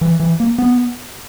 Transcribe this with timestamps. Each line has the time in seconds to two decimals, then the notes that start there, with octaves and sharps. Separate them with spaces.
0.01 E3
0.20 E3
0.40 A#3
0.58 B3